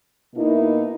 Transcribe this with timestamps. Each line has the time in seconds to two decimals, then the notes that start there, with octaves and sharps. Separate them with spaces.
0.35 B2 A#3 D#4 E4